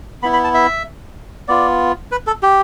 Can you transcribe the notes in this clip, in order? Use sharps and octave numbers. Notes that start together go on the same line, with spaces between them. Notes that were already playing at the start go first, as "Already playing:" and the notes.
B3 E4 B5
B5
A5
E5
B3 F4 D5
B4
A4
G4